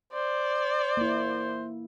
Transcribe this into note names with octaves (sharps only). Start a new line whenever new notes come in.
C5 D5
A#3 E4